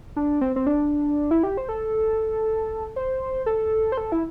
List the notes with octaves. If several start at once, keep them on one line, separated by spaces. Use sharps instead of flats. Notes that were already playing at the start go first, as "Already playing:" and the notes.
D4
C4
C4
D4
E4
G4
C5
A4
C5
A4
C5
A4
E4